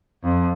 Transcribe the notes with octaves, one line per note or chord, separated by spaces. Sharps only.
F2